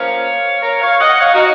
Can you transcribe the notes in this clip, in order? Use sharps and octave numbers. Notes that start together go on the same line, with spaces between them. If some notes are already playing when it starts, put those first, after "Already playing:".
Already playing: F3 A#3 C#4 C#5 F5
A#4 C#5
C#5 F5
D#5 F#5
C#5 F5
D#4 F#4